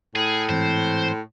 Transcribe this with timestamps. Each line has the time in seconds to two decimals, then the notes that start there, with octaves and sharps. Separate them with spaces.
0.16 A2 G#4
0.49 G#2 E3 C4 C5